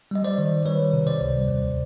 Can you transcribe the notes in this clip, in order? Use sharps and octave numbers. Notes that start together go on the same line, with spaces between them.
G3 D#5
C5 D5
D#3
G3 B4 C#5
C3
C5 D5
C#2
D#2